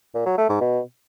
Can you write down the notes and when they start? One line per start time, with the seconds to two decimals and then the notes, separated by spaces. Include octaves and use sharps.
0.15 A#2
0.26 F#3
0.38 A3
0.49 G#2
0.61 B2